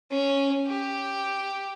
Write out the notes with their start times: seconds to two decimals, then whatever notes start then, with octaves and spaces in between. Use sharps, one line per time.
0.11 C#4
0.66 G4